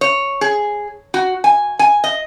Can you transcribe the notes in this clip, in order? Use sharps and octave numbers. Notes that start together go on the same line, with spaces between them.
C#5
G#4
F#4
G#5
G#5
D#5